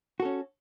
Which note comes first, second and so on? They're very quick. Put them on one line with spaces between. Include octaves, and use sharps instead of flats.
F#4 A4 C#4